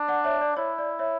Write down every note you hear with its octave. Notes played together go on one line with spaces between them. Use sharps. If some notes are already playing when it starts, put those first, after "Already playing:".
Already playing: D4
D5 F#5
C#5 E5
D5
E4 C#5
D5
C#5 E5